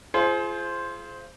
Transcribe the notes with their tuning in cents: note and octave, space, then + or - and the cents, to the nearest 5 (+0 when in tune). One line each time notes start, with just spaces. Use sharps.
F4 -25 G#4 +35 C5 +0